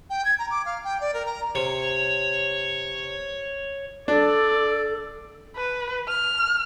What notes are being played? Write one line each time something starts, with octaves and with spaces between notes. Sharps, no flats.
G5
G#6
A#5
D6
F5
G5
D5
A#4
A#5
C3 C#5
D4 A4 D5
B4
F6